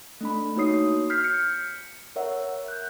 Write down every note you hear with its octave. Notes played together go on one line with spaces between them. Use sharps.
A3 D4 B5
A#3 D#4 F#4 C#5 D#6 C7
F6 G6 B6 C7
C#7
A#4 C#5 E5 F#5
F#6 G6